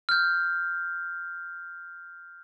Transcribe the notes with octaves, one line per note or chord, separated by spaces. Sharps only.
F6 G6